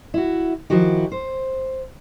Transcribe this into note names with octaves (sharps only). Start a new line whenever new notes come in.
E4 F#4
D#3 F3 E4 F#4 G4
C5